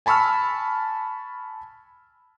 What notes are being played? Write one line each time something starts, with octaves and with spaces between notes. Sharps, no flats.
G#5 A5 B5 C#6 E6 F6